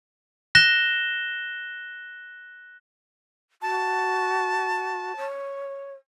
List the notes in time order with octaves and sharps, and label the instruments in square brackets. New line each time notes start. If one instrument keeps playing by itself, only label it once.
[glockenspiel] F#6 A#6 E7 G7
[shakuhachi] F#4 [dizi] A5
[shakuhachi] C#5